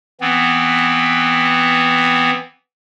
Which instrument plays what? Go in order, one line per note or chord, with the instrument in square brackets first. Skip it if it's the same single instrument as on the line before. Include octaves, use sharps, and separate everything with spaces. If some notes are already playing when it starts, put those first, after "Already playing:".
[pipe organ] E3 B3 C4